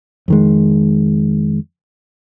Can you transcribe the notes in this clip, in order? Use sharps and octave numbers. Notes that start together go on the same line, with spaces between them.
F2 D#3 G#3